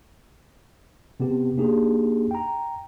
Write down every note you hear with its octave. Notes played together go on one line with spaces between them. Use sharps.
C3 B3 C4 G4
A#3 D4 D#4 G4 G#4
G5 A#5